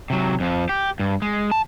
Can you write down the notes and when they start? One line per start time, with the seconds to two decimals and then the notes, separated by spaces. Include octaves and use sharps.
0.10 C3 F#3
0.40 F2 F3
0.69 G4
0.99 G2
1.22 G#3
1.51 A5